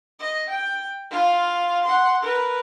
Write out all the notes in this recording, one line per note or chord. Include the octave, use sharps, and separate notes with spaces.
D#5
G5
F4 F5
F#5 C6
A#4 B4